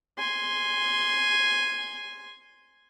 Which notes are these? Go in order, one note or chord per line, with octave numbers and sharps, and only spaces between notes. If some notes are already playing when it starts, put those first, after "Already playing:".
G#5 C6